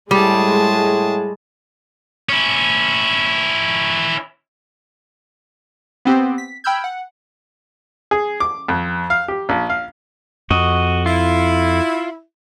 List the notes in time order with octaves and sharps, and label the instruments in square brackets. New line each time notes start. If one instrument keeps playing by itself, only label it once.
[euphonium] A2 [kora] G3 [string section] G#3 [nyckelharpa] G#4 A5
[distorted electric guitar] C#4 E4
[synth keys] B3 C4 G4
B6
G5 B5 E6 F6 G6 G#6
F#5
[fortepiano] G#4
D6
F2
F5
G4
A#1
F5
[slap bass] F2 [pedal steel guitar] F#4 D#5
[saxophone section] E4 [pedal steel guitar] F4